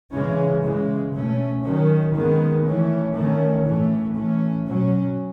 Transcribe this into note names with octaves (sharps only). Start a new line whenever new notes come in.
C#3 E3 G#3 C#4
C#3 E3 G#3
B2 A3 C#4
D#3 F#3 C#4
D#3 G#3 B3
E3 A3 C#4
D#3 A3 C#4
A2 E3 A3 C#4
E3 A3 C#4
B2 F#3 C#4